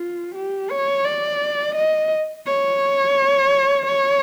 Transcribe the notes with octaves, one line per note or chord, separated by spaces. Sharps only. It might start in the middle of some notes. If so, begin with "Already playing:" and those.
Already playing: F4
G4
C#5
D5
D#5
C#5
C#5